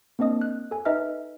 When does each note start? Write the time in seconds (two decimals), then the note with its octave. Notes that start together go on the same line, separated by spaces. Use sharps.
0.19 A#3 C4 D4 D#5 D#6
0.41 F#6
0.71 A4 G#5
0.85 D#4 B4 D#5 E5 F6